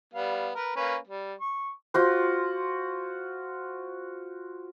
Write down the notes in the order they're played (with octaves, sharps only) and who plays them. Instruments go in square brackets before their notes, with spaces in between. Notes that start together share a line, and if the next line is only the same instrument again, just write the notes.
[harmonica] G3 B3 F5
A#4 B4
A#3 C#4 B4
G3
C#6
[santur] F4 F#4 C5